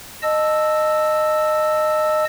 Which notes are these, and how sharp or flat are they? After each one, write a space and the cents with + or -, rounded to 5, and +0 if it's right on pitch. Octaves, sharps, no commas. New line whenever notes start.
D#5 -15 A5 +0 E6 -5